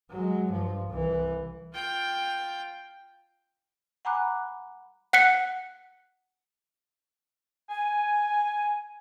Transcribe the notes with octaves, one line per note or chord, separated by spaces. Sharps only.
F#3 G#3
G2 F3
C2 E3
F4 G5
F#5 G#5 A#5 B5 D6 F#6
F#5 F#6 B6 C#7
G#5